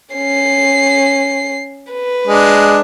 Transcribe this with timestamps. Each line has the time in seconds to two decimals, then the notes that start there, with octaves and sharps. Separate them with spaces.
0.15 C#4 C7
1.92 B4
2.27 G#3 D4